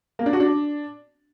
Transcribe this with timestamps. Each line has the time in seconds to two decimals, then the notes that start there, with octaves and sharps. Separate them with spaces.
0.19 A#3
0.26 D4
0.33 F#4
0.40 D4